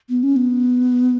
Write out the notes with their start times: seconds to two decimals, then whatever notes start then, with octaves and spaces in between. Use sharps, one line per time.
0.10 B3
0.23 C#4
0.36 B3